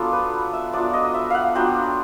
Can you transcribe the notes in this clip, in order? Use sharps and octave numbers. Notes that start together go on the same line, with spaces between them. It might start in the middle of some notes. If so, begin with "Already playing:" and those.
Already playing: F#3 B3 D4 F4 A4
B4
E5
F#3 B3 D4 F4 D5
D#5
E5
F5 F#5
F#3 B3 D4 F4 G5